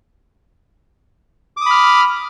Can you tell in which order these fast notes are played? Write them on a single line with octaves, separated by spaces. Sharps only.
D6 D#6 B5 F6